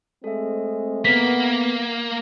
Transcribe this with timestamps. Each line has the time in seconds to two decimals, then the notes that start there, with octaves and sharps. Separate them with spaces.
0.24 G#3 A3 C4 A4 E5
1.05 A#3 B3 B6